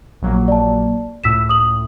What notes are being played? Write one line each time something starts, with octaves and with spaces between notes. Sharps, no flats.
A#1 F#3 A#3
D5 A5
C#2 A2 E6 B6 E7
D#6 F#7